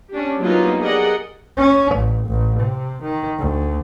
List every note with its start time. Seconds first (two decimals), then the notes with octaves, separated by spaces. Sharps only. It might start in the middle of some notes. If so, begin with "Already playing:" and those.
0.11 C#4 D4 G4
0.39 F#3 G3 A#3 B3 D#4 F4
0.80 G4 G#4 A#4 D5 D#5 F#5
1.58 C#4
1.96 A1
2.27 A1
2.60 C3
3.03 D#3
3.39 D2